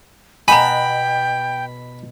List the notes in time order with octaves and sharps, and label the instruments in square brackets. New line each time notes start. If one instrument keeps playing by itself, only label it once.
[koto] B2 B3 D#5 [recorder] G5 [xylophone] G#5 A#5 [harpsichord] B5